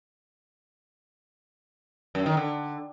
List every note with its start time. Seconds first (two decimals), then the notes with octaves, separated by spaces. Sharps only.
2.15 F#2
2.26 D#3
2.37 D3